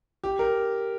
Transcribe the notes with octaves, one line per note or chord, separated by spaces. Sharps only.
G4
A#4